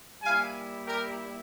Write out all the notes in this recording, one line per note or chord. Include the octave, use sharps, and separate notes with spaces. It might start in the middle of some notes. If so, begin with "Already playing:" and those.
G3 A#3 E4 F5 G#5
G4 A#4